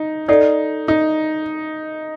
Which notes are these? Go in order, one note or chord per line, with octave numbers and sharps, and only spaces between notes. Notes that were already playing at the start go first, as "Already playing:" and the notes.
Already playing: D#4
D#4 A4 D5 F#5
D#4